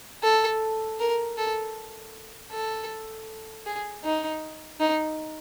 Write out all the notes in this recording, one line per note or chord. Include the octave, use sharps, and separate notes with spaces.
A4
A#4
A4
A4
G#4
D#4
D#4